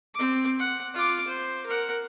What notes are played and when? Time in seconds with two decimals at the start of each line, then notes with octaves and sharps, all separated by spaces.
0.14 C4 D6
0.59 F#5
0.94 F4 D6
1.28 C5
1.66 A#4 F#5